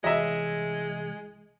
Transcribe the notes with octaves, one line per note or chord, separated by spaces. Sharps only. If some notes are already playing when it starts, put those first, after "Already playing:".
C2 E3 G#3 C#5 D#5 E5